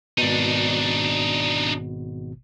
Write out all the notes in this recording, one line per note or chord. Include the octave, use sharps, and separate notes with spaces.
G#1 B2 D4 D#4